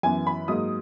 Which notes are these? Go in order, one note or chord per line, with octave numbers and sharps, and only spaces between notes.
F#2 E3 B3 G#5
B5
G#2 F#3 A#3 D#6